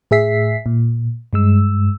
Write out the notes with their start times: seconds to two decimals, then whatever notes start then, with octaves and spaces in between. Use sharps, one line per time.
0.11 A2 G#4 E5 B6 C7
0.66 A#2
1.33 G2 G#3 E6